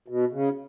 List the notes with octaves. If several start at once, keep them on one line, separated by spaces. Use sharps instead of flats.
B2
C#3